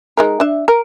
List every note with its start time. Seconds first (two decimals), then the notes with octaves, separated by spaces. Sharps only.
0.17 G#3 D#4 A#4
0.40 D4 E5
0.68 A#4